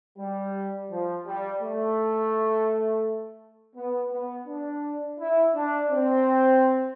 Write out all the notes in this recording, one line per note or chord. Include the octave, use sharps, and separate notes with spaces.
G3
F3
G3
A3
B3
B3
D4
E4
D4
C4